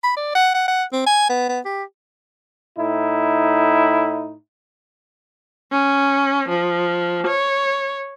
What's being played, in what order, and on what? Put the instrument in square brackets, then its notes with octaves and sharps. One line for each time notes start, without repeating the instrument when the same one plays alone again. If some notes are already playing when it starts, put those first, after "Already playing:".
[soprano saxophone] B5
D5
F#5
F#5
F#5
C4
G#5
B3
B3
G4
[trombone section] A2 D#4 E4
[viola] C#4
F3
C#5